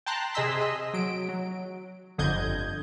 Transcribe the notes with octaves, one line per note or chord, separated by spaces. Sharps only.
G5 A5 A#5 C6 F#6
C3 G#4 D#5 C6 E6 B6
D#5
F#3 D7
F#3
G1 F2 D3 D#5 G6 G#6